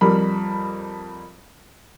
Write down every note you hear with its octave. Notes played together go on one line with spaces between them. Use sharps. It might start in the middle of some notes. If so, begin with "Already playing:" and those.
F2 G3 A#4 B5